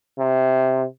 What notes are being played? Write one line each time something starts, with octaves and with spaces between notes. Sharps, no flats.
C3